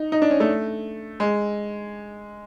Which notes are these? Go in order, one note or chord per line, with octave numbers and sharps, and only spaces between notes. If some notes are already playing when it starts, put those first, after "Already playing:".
Already playing: D#4
D#4
D4
C#4
A3
G#3